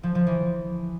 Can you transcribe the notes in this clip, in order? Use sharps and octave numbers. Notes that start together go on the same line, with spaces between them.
F3
F3
E3